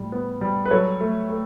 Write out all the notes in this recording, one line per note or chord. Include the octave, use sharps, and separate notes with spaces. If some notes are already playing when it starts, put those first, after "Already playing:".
Already playing: A2 G3
B3
G3
B4
F#3 A4 C#5
A3
A3